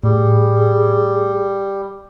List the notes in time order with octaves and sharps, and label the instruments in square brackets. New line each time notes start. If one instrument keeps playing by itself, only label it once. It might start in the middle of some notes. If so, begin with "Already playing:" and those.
[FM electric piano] A2 [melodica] G3 [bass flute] G#4